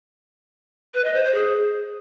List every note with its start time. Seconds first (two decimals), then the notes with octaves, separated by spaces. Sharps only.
0.94 B4
1.04 D#5
1.14 C5
1.24 C5
1.34 G#4